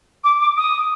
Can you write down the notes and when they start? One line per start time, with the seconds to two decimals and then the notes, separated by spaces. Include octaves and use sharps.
0.24 D6
0.41 D6
0.57 D#6